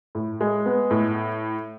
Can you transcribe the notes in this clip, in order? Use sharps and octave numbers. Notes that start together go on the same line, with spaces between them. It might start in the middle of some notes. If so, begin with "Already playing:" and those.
A2
G#3
B3
A2